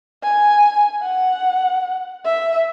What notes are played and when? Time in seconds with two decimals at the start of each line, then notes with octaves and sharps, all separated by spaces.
0.23 G#5
1.02 F#5
2.25 E5